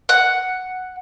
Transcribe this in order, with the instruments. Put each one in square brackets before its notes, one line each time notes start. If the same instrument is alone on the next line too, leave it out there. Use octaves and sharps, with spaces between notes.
[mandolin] F#5